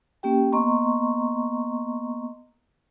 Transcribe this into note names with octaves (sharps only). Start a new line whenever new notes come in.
A#3 C#4 G4 G5
A#3 B3 D#5 A#5 C6 C#6